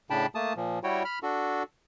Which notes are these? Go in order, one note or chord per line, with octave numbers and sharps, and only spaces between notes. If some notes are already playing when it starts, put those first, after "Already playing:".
A2 C#3 D4 G5 A5 B5
A3 A#3 A5 D#6
A#2 F3
G3 E4 F#4 C#5 G5
B5 F6
D4 F#4 A4